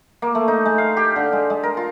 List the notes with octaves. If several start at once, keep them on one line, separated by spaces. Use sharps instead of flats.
A#3
A3
D#4
G#3
F5
G4
D3
G#3
G#3
A#4
F4